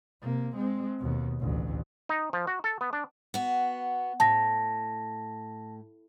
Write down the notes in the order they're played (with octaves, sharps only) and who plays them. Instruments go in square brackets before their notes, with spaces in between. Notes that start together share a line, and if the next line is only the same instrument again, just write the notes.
[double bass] C3 A#3
G#3 C4
D#2 B2
A1 D2
[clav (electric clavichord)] D#4
F3
F#4
A4
B3
D4
[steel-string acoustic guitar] B3 F#4
[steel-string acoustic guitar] A2 [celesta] A5 A#6